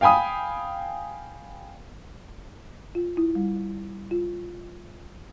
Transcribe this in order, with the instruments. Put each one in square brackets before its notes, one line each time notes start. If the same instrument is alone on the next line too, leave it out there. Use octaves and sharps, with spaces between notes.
[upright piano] F5 G5 G#5 B5 D#6
[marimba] F4
E4
G3
F4